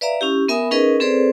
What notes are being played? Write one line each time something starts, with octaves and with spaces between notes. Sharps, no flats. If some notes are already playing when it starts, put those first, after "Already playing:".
B4 D5 E5 F5 A#5
C#4 E4 G4
B3 A#4 E5 G#5 B5 D#6
C#4 D#4 G#4 A#4 B4 D#5
C4 G#4 A4 B4 C5 D5